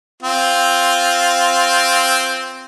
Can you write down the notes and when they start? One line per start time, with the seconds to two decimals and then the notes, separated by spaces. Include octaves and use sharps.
0.23 C4 F4